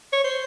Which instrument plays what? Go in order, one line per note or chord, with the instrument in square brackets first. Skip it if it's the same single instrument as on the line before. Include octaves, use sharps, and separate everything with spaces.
[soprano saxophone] C#5
C5